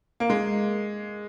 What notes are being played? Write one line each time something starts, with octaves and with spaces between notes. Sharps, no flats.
A#3
G#3